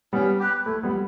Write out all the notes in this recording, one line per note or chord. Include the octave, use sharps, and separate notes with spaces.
G3 B3 C#4
G4 B4
A3 E4
G3 B3